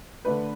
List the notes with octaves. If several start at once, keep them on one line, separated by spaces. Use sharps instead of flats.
D3 A3 D4 B4